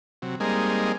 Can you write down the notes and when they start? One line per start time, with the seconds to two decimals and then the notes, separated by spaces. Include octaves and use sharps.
0.22 C3 F#3
0.40 G3 G#3 A#3 C4 D#4 G#4